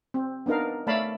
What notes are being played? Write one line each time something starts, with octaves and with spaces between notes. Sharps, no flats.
C4
B3 D4 D#4 A#4 F5
A3 C#5 D5 F5 A5 B5